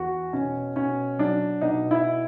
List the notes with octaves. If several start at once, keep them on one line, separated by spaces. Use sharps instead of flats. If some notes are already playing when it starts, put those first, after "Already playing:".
Already playing: E2 F#4
B2 C#4
B2 C#4
F#3 D4
B2 D#4
E4